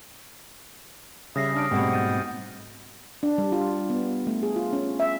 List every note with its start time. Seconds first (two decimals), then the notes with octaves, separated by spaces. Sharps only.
1.36 C#3 G3 E5 D#6 A#6 C7
1.54 D4 D#6 F6 D7
1.71 G#2 B2 G3 A3 C4 F#5
1.93 G6 A6 D#7
3.23 D4
3.38 G3
3.52 F4
3.90 B3
4.27 A3
4.43 G#4
4.56 F4
4.73 C#4
5.00 E5